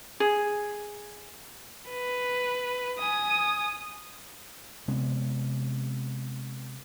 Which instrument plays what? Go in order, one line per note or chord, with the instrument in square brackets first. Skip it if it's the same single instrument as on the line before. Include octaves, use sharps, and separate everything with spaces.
[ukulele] G#4
[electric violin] B4
G#5 D#6
[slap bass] C3 G#3 B3